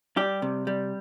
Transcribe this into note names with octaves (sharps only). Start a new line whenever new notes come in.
G3 G4
C3
G3